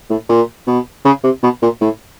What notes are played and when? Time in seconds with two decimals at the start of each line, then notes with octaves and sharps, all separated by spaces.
0.10 A2
0.29 A#2
0.67 B2
1.05 C#3
1.24 C3
1.43 B2
1.62 A#2
1.81 A2